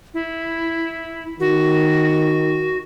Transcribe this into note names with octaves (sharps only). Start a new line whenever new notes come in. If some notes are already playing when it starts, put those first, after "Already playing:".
E4
D#3 F#4